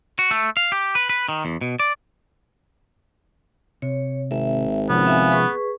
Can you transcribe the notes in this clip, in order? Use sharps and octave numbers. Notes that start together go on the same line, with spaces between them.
F#4
A3
F5
G4
B4
B4
D#3
E2
B2
D5
C3 C#5
G#1 E5
C3 F3 B3 C#4
E5 F5 G#5
G#4 B4 C#6